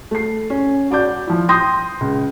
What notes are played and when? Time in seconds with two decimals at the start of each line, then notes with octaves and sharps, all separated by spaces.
0.11 A3 C7
0.50 C#4
0.91 F#4 D5 D6 G6
1.27 F3 E4
1.49 G5 C6 D#6 G6 A#6
2.01 C#2